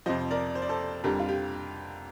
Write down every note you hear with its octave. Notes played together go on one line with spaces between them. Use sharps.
F2 C3 F3 C5 D#5
A#4 D5
C5
D5
A4 C5
F2 D3 G3 G4 A#4
F4
G4